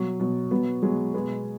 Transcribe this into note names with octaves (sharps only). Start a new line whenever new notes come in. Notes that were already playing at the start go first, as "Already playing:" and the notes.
Already playing: B2 F#3
B2 F#3
B2 F#3 B3
B2 F#3 G#3
B2 G#3 B3